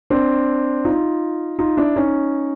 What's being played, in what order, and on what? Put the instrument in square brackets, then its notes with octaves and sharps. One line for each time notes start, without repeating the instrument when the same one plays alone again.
[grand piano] C4 D4
D#4 F4
D#4 F4
D4 E4
C#4 D#4